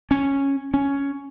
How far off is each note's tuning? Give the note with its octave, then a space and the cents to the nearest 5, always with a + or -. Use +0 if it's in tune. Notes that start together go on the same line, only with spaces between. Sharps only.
C#4 -5
C#4 +5